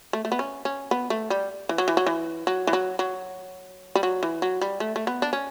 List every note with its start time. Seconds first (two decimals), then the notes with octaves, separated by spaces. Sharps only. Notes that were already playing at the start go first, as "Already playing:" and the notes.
0.13 A3
0.25 A3
0.32 B3
0.39 C#4
0.65 C#4
0.91 B3
1.10 A3
1.30 G3
1.69 E3
1.78 F#3
1.88 E3
1.97 F#3
2.07 E3
2.47 F#3
2.67 E3
2.73 F#3
2.99 F#3
3.95 G3
4.03 F#3
4.23 E3
4.42 F#3
4.61 G3
4.80 A3
4.96 A3
5.07 B3
5.22 D4
5.33 C#4